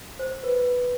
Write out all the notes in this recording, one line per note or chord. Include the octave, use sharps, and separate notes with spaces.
C5
B4